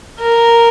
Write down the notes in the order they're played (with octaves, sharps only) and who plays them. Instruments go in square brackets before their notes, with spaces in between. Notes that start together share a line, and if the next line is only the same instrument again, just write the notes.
[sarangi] A#4